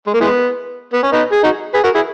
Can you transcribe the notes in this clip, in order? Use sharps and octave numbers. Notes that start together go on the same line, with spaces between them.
G#3
A#3
E3 G#3 B3
B3
C#4
B3 D#4
G#4
D#4 F#4
G#4 B4
F#4 A#4
E4 G#4